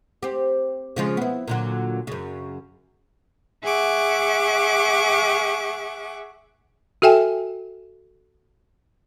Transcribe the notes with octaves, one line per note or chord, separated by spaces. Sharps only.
C4 G4
C#3 F3 G#3
B3 E4
A#2 D3 F#3
F#2 C#3
G#4 E5 F#5 C#6 D6
F#4 A4 E5 G5 G#5